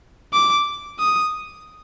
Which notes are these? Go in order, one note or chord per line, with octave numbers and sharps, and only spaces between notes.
D6
D#6